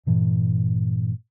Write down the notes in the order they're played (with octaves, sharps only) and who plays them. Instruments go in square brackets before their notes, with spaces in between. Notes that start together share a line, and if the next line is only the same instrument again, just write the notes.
[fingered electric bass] G2 A#2 E3